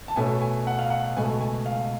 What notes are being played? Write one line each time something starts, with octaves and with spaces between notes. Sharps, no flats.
A5
B2 A3 C#4 G#5
G#5
F#5
F5
F#5
C#2 B2 A3 G#5
G#5
F5